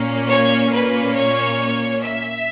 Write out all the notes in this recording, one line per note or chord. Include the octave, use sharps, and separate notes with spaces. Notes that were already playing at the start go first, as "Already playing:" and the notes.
Already playing: A#2 A#3 C#4
C#5
B4
C#5
E5